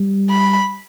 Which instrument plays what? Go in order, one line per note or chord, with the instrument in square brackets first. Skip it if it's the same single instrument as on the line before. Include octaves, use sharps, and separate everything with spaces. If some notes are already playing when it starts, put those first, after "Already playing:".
Already playing: [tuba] G3
[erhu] B5